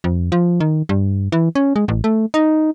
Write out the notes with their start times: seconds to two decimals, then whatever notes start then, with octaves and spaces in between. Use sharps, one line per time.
0.04 F2
0.32 F3
0.60 D#3
0.89 G2
1.32 E3
1.55 C#4
1.76 G#3
1.88 A1
2.04 A3
2.34 D#4